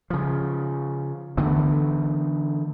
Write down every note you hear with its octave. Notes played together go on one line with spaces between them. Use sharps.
C#3 F3
D3 E3 A3 B3